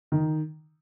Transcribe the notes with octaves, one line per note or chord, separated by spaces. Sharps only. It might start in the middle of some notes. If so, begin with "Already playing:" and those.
D#3